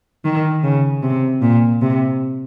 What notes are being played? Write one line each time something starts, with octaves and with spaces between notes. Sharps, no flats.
D#3
C#3
C3
A#2
C3